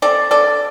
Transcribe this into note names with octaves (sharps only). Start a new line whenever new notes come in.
C4 A4 D5
D3 A4 D5